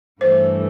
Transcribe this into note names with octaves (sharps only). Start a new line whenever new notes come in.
G2 E3 A3 C5